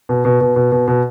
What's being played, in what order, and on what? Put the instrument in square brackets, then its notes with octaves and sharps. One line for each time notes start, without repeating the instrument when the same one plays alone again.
[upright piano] B2
B2
B2
B2
B2
B2